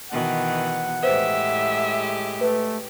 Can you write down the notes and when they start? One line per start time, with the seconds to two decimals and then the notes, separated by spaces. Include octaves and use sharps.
0.11 B2 D#3 E3 F#5
1.03 A2 G#3 G4 B4 C5 E5
2.41 A3 B4